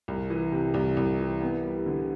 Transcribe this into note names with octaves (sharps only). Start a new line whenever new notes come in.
C2
E3
C3
C2
C2
E3
B3
G3
D3